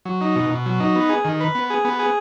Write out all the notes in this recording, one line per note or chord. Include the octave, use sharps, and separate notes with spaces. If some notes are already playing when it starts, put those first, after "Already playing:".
F#3
D#4
B2
B2
F#3
D#4
B3
G#4
D#3
B4
B3
G#4
B3
G#4